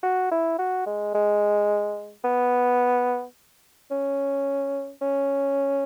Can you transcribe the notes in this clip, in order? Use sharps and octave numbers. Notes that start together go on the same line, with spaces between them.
F#4
E4
F#4
G#3
G#3
B3
C#4
C#4